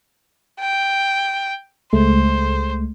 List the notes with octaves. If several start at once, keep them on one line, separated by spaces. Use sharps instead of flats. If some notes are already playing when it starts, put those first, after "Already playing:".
G5
C#2 G#3 A3 C5